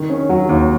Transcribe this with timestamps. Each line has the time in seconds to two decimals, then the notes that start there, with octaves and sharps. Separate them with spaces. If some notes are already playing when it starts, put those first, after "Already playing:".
Already playing: D#3
0.10 C#4
0.29 F#3
0.49 D#2